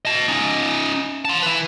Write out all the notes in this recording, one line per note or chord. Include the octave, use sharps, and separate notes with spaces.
D#5 A5
C#4 D#4
A5 C6
E3 B4